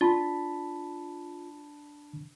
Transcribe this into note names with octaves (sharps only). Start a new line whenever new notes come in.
D4 F4 A5 B5